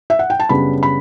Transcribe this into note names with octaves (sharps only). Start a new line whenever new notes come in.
E5
F#5
G5
A5
F#2 C#3 G3 B3 D4 B5
B5